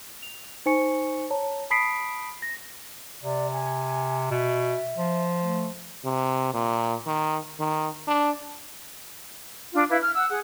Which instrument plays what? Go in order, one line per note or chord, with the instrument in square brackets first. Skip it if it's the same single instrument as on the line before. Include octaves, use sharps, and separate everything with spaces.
[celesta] F7
D#4 C5 G#5 C#6 C#7
C#5 A5 A#5
A5 B5 D#6 B6 C7 D7
A#6
[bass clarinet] C3 [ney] D5
[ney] G#5
[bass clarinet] B2 [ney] E5
[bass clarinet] F3
[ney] A3
[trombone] C3
A#2
D#3
D#3
D4
[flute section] D4 F4
E4 B4 F5
F6
F#5 E6
G#4 F#5